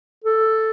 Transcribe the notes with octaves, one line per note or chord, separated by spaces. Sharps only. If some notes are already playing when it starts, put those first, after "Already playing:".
A4